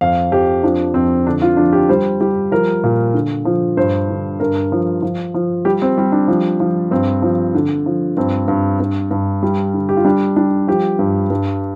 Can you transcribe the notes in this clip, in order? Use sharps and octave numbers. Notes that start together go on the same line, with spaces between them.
F2 F5
F2 G4
F3 D4
F2 C4
D3 D4
F4
F3 D4
G4
G3 C5
G3 G4
F3 A#4
A#2
D3
F3
G2 C5
D3
G2 A#4
F3
F3
F3
G3 G4
C4
G3
D4
F3
F3
G2 C4
F3
D3
F3
G2 C4
G2
G2
G2
G3
D3
G4
F4
G3 D4
G3 D4
F3 G4
G2
G2